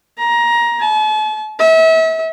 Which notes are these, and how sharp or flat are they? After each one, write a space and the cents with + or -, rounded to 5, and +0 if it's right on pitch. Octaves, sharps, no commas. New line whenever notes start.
A#5 +20
A5 -40
E5 -35